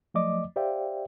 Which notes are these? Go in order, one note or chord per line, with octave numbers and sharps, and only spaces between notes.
F3 F#3 A3 D5 D#5 D6
G4 C5 D5 E5 F5 G5